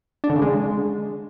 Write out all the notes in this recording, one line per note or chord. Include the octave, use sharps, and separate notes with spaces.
D4
D3
C#3
G#3